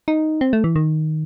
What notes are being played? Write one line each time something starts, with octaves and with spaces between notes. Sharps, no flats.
D#4
C4
A3
E3
D#3